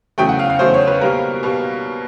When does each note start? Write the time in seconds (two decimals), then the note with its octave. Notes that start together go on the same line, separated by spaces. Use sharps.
0.18 E2 C#3 F#3 A3 G5
0.29 F#5
0.39 F5
0.50 F5
0.59 E2 C#3 F#3 A3 C5
0.74 C#5
0.87 B4
1.01 B2 G3 A#3 A#4
1.43 B2 G3 A#3